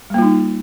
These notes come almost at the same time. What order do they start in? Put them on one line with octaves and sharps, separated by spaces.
G3 A#3 F4 D#4